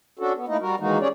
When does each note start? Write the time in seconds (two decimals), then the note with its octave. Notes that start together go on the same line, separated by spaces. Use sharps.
0.19 C#4 D4 F#4 A4
0.35 B3
0.48 A3 A#3 D#4 E4 D#5
0.60 G3 F#4 A#4
0.80 D#3 E3 G#3 A#3 D#4 F#4
1.00 G3 C#4 G#4 C#5 D5